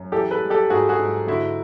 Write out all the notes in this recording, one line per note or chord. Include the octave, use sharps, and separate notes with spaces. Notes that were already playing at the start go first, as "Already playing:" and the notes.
Already playing: F#2
E3 G4 A4
A4 B4
G3
G4 A4
G#2 F#4 G#4
F#4 G#4
G#2
D3 E4 F#4